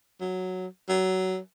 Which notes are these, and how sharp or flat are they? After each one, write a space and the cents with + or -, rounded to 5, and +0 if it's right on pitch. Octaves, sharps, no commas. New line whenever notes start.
F#3 +0
F#3 +20